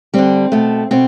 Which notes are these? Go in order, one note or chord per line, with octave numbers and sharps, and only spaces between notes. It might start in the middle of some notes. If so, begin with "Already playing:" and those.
D3 G3 C4
B2 A3
B2 C4